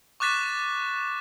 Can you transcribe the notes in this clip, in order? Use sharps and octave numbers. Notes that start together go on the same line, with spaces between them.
C#6 D6 F#6 A6 B6 E7